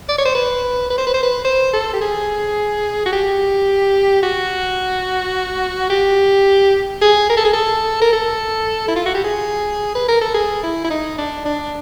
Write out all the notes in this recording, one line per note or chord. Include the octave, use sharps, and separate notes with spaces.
D5
C#5
C5
B4
B4
C5
B4
C5
B4
C5
A4
G4
G#4
F#4
G4
F#4
G4
G#4
A#4
A4
G#4
A4
A#4
A4
E4
F4
F#4
G4
G#4
B4
A#4
A4
G#4
E4
E4
D#4
D4
D4